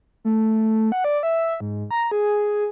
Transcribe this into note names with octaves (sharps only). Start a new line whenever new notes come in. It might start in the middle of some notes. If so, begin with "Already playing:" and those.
A3
F#5
D5
E5
G#2
A#5
G#4